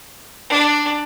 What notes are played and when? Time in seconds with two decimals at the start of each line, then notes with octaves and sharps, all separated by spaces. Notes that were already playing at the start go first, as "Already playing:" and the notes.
0.49 D4